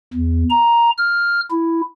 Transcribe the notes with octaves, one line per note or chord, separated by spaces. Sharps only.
E2
A#5
F6
E4